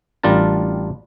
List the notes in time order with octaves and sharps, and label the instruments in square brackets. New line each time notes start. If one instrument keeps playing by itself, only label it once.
[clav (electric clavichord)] A1 G3 D4 F4 A#4 A5